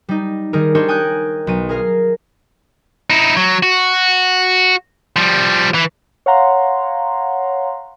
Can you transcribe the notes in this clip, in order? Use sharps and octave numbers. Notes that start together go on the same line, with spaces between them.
G3 D#4
D#3 G3 G#4 A#4
D4 D#4 G4 A#4 C5 C#5
G5 G#5 D#6 F#6 G6
B1 D#7
G#4 A#4 F5
D#4 E4
F#3
F#4
F3 G3
E3
C#5 F5 F#5 A#5 C6